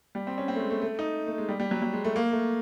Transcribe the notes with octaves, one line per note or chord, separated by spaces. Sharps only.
G3
C4
C#4
C4
A3
G#3
A3
A3
D#4
A3
G#3
G3
G3
F#3
F#3
G#3
A3
A#3
A3